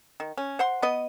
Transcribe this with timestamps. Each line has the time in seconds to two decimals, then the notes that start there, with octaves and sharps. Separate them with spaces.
0.20 D#3
0.38 C#4
0.59 C5 F#5 C6
0.82 B3 B4 D#5